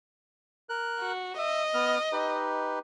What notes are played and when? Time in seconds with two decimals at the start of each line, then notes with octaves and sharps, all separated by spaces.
0.69 A#4 F#6
1.00 F#4
1.38 D#5 E5
1.74 B3 F6
2.12 D#4 G4 B4